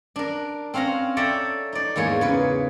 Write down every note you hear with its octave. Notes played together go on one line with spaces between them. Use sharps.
D4 A#4
C4 C#4 F5 F#5 A#5
A4 C#5 D5 E5 G5 A#5
D#4 D5
E2 G#2 A#3 C#5 G#5
C#3 B4